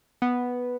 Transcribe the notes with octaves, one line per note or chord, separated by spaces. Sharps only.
B3